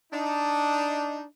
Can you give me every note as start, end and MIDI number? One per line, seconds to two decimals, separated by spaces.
0.12 1.24 62
0.12 1.24 63